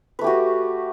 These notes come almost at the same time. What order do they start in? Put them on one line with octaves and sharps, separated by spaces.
B4 A3 G4 F#4